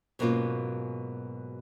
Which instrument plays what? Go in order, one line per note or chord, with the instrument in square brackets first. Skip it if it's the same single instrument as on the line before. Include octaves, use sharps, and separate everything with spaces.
[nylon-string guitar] G#2 B2 F#3 A#3 C#4 F4